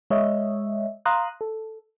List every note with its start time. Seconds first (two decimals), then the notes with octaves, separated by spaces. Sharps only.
0.10 G#3 C#5 D#5 E5
1.05 F5 A#5 C6 D#6 F#6
1.41 A4